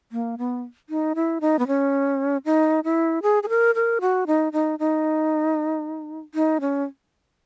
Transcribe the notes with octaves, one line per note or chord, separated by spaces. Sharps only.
A#3
B3
D#4
E4
D#4
B3
C#4
D#4
E4
G#4
G#4
A#4
A#4
F#4
D#4
D#4
D#4
D#4
C#4